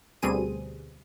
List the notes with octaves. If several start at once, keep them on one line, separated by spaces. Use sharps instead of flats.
D2 B2 G3 C4 G#4 D#7